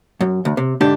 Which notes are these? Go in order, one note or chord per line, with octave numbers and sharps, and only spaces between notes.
F#2
D2
C3
G#2 D3 D4 G4